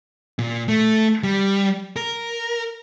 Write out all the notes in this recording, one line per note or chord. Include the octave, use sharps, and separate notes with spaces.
A#2
A3
G3
A#4